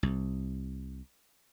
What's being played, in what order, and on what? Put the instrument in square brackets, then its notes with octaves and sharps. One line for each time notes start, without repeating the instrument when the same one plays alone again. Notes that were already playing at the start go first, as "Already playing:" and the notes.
[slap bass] C2